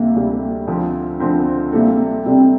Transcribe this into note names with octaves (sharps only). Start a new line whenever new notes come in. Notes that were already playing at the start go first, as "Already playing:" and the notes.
Already playing: D2 C3 G3 A#3
D2 C3 G3
D2 D3 F3 C4
D2 D3 F3 C4
C3 G3 A#3 D4 A4
C3 G3 C4 D4 A4